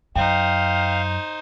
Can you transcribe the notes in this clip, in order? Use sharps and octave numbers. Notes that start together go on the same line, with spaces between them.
F#2 D#4 C5 F5 G5